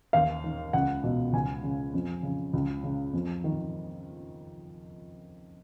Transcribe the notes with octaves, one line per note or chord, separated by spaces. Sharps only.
D#2 F5
D#3
C#2 F#5
B2
C#2 G#5
C#3
F2
C#3
C#2
C#3
F2
D#3